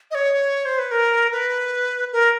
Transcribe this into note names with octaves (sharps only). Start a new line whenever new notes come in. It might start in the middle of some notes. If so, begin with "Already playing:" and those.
D#5
C#5
C5
B4
A#4
B4
A#4